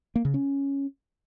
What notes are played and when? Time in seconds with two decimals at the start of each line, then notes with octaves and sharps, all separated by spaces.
0.16 A#3
0.25 C#3
0.34 C#4